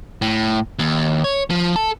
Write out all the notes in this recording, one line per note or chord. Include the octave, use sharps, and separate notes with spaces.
A2
D#2
C#5
F3
A4